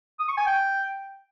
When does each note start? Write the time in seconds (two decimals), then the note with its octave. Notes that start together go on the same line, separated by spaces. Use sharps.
0.19 D#6
0.28 C#6
0.37 G#5
0.46 G5